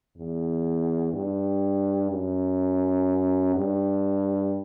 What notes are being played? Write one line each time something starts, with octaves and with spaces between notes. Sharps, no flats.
E2
G2
F#2
G2